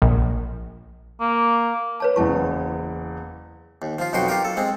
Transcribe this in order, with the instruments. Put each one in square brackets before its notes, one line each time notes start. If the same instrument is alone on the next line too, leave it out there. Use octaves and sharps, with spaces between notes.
[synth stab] A#1
[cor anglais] A#3
[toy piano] B4 C#5 A5
[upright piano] F#1 E2 E3 [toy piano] A5 C#6
[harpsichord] D#2
F3 F4
B1 F2 B2 F#4 G5 C6
F4 G4 A#4 G5
A4
G#3 C4